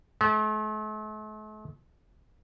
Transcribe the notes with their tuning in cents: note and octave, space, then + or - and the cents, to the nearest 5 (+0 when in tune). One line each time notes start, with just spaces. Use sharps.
A3 -45